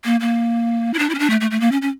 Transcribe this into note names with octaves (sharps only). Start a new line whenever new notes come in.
A#3
A#3
E4
D4
E4
C#4
D4
A3
A3
A3
A#3
C#4
C#4